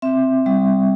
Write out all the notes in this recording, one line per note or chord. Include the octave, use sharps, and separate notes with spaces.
C4 E5
G3